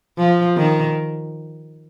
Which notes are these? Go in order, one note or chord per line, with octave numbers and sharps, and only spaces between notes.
F3
D#3